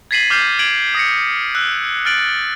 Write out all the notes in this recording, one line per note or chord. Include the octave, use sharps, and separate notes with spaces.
G#6 A6 B6 C7 D#7 F#7
D6 F6 G6 C7
G#6 D7 F#7
D#6 A#6 C#7
E6 F#6
F6 A6 D7 F#7